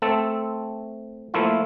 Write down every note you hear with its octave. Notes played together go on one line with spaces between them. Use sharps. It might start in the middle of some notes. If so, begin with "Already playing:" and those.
A3 C4 A4
F3 A3 A#3 E4 F4